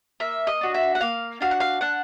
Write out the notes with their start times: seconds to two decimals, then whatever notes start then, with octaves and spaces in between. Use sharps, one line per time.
0.20 A#3 E5
0.47 D#5
0.61 D4 F#4
0.74 E5
0.95 F#5
1.01 A#3 F5
1.41 D4 F#4 F5
1.51 F#5
1.60 F5
1.81 D4 F#5